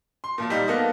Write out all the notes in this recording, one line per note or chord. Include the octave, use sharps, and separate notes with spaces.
C6
A#2 F3 F4
G3 D#4
A#3 B3 A4 D#5